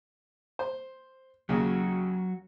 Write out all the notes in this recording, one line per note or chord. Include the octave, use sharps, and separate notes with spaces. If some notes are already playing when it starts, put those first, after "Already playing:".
C5
D#2 C#3 F#3 F#4